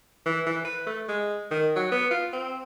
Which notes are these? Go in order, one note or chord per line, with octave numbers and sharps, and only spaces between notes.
E3
E3
B4
A3
G#3
D#3
F#3
B3
F4
C4